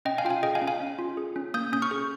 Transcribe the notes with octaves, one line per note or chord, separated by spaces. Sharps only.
C#4 D#5 G5
F5 G#5
F4 G5
F5 G#5
G#4 D#5 G5
F5 G#5
C#4
F5 G#5
C#4
F4
G#4
C#4
A#3 D#6 G6
C#4 D#6 G6
C#6 F6
G#4